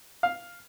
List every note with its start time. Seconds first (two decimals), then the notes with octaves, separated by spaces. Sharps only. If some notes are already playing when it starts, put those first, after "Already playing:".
0.23 F5